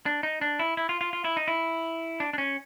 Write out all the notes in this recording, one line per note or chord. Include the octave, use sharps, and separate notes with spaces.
D4
D#4
D4
E4
E4
F4
F4
F4
E4
D#4
E4
D4
D4
C#4